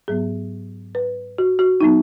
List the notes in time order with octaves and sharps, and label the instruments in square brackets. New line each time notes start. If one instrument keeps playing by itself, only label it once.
[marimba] G#2 F#3 B3 G#4
B4
F#4
F#4
F#3 B3 D#4